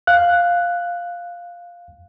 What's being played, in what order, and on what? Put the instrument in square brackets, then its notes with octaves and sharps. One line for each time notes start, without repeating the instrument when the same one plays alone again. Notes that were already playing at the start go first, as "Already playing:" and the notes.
[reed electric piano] F5 F#6